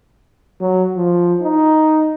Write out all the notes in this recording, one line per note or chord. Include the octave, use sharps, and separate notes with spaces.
F#3
F3
D#4